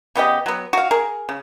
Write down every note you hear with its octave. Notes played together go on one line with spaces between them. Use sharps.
C#3 B3 G4 D#5
F#3 B3
F#4 F5
G#4 A#4
C#3